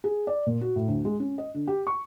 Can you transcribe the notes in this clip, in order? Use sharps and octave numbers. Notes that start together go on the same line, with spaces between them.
G#4
D5
A#2
F#4
A2
D2
G#3
C#4
D#5
D3
G4
C#6